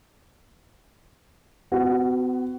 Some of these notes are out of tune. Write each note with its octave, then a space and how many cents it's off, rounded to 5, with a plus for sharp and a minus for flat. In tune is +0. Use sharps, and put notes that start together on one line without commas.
B3 +45 F#4 +10